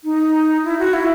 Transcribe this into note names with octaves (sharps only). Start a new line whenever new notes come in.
D#4
E4
F#4
E4